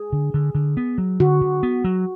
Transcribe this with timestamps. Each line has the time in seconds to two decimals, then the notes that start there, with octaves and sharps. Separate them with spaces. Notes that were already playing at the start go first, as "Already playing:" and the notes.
Already playing: G#4
0.13 D3
0.34 D3
0.55 D3
0.77 B3
0.98 F#3
1.20 D3 F#4
1.41 D3
1.63 B3
1.84 F#3